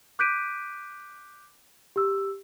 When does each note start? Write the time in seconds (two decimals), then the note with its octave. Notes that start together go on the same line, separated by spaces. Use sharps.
0.19 D6 F#6 G6 B6 D7 D#7
1.96 G4 E6